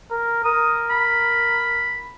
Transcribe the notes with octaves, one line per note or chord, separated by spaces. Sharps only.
A#4
A#4 D#6
B5